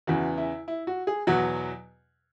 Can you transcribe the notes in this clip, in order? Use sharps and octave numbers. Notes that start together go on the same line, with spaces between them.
E2 C#3 E3 F#4
E4
E4
F#4
G#4
E2 B2 F#3 F#4